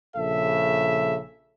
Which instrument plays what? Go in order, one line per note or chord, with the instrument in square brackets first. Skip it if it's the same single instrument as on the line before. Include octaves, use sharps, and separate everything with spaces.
[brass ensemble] A#1 C#3 A4 E5